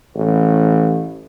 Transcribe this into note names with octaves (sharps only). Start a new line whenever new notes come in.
A1